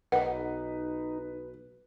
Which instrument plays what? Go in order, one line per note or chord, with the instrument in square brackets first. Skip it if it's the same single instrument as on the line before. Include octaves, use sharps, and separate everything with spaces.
[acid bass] B1 [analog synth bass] D#4 [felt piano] B4 [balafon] F#5